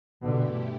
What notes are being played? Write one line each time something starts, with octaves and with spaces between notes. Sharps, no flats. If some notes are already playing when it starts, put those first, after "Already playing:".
G2 B2 D3 E3 A3 E4 G4